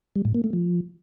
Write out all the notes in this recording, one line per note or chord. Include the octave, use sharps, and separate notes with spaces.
G3
A2
A#3
A3
F3